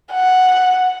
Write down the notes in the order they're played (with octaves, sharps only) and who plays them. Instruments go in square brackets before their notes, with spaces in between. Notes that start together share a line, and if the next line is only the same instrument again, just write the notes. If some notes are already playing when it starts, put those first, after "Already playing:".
[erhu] F#5